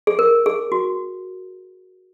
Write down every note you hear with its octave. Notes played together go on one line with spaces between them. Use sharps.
G#4
A#4
G#4
F#4